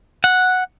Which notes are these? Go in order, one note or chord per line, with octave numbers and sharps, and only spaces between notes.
F#5